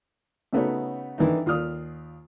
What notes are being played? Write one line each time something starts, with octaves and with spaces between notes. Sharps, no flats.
C#3 A3 B3 D#4 F#4 C#5
D#3 E3 D4 D#4
D#2 F4 D5 D#6 F6